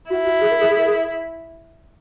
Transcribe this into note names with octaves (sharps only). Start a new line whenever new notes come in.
E4 F#4
F#4
G#4
A#4
G#4
G#4
A#4
G#4